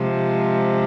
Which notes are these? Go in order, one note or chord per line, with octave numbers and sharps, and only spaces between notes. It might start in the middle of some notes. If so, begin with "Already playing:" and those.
Already playing: C3 F3 G#3